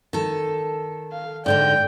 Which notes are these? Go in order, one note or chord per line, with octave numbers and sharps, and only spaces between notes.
D#3 A4
F5
G#2 D3 D#4 D5 G5 G6